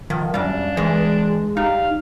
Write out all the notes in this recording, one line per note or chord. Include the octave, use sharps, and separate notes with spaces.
D#3 F3
F#2 G3 D4 F5
E3 G#3
G3 D#4 F5